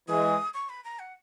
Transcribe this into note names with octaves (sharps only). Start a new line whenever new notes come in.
E3 G#3 D#6
C#6
B5
A#5
F#5